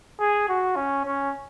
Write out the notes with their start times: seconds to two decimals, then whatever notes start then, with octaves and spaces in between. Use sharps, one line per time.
0.20 G#4
0.49 F#4
0.76 C#4
1.05 C#4